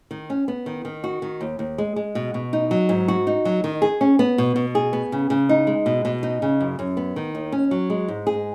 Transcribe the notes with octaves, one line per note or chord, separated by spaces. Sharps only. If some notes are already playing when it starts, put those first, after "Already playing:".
D#3
C#4
B3
D#3
D#3
F#4
D#3
D#2
D#2
G#3
G#3
B2
B2
D#4
F#3
G#2
F#4
D#4
F#3
D#3
G#4
C#4
B3
B2
B2
G#4
B3
C#3
C#3
D#4
G#3
B2
B2
D#4
C#3
F#2
F#2
B3
D#3
D#2
C#4
F#3
G#3
G#2
G#4